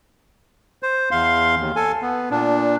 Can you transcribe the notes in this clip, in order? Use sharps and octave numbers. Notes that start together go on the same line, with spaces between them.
C5
E2 F5 C6
D#2
A4 G#5
B3
A#2 D4